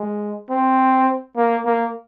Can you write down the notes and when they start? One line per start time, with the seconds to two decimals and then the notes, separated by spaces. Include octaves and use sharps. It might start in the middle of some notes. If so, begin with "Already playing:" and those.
Already playing: G#3
0.50 C4
1.37 A#3
1.66 A#3